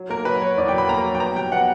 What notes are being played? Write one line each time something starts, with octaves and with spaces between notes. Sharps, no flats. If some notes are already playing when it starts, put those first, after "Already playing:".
Already playing: F#3
A#3 A#4
F#3 B4
F#3 C#5
E2 D5
F#3 G5
B5
A#3 A#5
F#3
G5
B3 A#5
G3 G5
B3 F#5